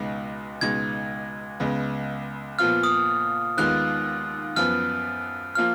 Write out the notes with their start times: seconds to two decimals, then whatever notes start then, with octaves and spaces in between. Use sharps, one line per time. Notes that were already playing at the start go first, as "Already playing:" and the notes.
Already playing: C#2 B2 G#3 D#4
0.61 C#2 B2 G#3 D#4 G#6
1.60 C#2 C#3 G#3 B3
2.59 A#2 F3 B3 F4 F6
2.83 D#6
3.58 D#2 D#3 G#3 B3 F4 F#6
4.56 F#2 F3 B3 F6
5.55 F3 A#3 F4 F6